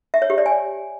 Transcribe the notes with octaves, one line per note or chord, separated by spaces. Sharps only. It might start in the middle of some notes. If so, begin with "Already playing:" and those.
E5
C#5
G4
D5
G#5